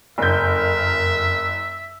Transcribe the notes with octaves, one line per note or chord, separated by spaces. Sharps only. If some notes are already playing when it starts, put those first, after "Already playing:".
F#1 F2 A#4 E5 G6